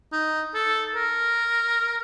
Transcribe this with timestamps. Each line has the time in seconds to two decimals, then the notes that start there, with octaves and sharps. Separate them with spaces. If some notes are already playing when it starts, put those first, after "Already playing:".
0.12 D#4
0.54 A4
0.95 A#4